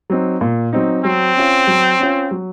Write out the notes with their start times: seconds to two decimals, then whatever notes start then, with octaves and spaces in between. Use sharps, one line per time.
0.10 F#3 C4 D#4
0.41 A#2
0.73 F#3 C4 D#4
1.05 F#3 C4
1.36 C#4 F4
1.67 F#3
1.99 C#4 F4
2.31 F#3